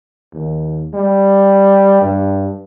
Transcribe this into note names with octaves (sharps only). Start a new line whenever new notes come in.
D#2
G3
G2